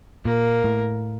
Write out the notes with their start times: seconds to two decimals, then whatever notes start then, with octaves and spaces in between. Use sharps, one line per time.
0.25 A#2 A#3
0.64 A2